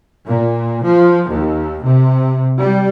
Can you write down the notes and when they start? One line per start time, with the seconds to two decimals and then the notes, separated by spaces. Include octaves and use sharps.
0.25 A#2
0.83 F3
1.27 D#2
1.83 C3
2.59 G3